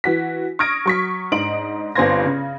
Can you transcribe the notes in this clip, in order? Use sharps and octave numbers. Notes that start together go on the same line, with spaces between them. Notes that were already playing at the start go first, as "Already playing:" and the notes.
E3 F#4 B6
C#6 D#6 F6 G#6 A#6 D7
F#3 C#6 B6
G#2 D4 D#5 C6 D7 F#7
G1 G2 C4 C6 G#6 A#6
C#3